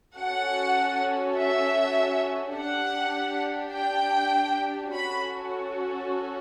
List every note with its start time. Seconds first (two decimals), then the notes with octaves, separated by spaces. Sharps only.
0.16 C#4 F#4 A4 F#5
1.36 E5
2.55 D4 G4 F#5
3.73 G5
4.93 C#4 F#4 A4 B5